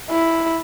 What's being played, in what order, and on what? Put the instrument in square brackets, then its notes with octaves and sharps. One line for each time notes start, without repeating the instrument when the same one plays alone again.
[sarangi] E4